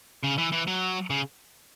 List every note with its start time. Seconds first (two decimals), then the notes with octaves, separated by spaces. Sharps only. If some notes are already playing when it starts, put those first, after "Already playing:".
0.23 C#3
0.38 E3
0.52 E3
0.67 F#3
1.10 C#3